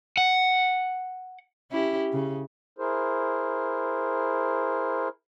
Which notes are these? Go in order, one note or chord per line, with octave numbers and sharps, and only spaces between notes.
F#5
C#4 E4 G4
C#3
E4 G#4 A#4 C5